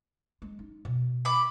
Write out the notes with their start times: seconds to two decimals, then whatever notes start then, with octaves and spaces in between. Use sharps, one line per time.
0.42 G#3
0.59 D#4
0.85 B2
1.25 B5 D6